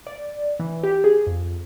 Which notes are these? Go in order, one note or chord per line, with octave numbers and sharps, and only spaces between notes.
D5
E3
G4
G#4
F2